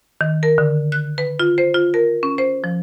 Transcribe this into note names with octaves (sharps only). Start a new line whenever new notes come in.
D#3
A#4
D3
F#6
B4
F4
C5
F4
A#4
C#4
C5
F3